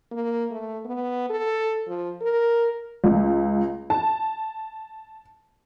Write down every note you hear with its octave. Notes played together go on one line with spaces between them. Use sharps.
A#3
A3
B3
A4
F3
A#4
C#2
A5